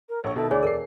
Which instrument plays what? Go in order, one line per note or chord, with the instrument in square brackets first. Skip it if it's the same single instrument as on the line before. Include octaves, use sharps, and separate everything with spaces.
[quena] A#4
[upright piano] A#1 A4 C#6 [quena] C#5
[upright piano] B2 D#3 E4 [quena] A4
[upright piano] D2 [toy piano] G#4 C#5 G#5 [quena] D5
[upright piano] E1 C7 [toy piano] A4 A#4